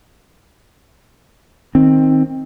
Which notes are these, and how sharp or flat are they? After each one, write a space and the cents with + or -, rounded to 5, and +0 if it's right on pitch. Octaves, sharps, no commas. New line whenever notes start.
D#3 +10 C4 +15